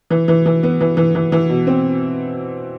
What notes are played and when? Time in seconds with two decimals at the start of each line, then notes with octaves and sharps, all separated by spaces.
0.10 E3
0.28 E3
0.46 E3
0.63 B3
0.81 E3
0.97 E3
1.15 E3
1.32 E3
1.49 B2
1.67 C4